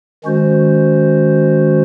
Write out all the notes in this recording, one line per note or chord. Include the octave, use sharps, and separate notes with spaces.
D#3 G#3 C#4 F#4 C5